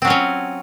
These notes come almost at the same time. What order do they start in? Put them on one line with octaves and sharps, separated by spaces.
C4 F#3 F4 C#4